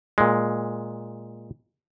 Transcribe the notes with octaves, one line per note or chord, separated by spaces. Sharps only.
A#2 G#3